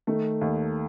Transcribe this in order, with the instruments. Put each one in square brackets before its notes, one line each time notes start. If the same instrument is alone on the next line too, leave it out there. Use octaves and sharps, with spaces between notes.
[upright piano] D#3 [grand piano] A3
[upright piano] D#2